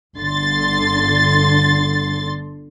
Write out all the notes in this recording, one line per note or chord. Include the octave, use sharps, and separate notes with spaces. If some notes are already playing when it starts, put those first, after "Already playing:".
G1 D3 C6 A6